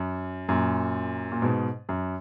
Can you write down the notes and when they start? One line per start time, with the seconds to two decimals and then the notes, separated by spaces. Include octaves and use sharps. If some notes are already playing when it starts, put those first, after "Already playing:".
Already playing: F#2
0.49 F#2 A#2
1.32 A#2
1.42 G#2 B2
1.89 F#2